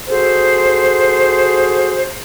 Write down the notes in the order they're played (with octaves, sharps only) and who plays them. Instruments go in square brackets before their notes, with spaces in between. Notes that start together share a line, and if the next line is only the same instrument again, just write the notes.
[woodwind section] F#4 G#4 A4 C5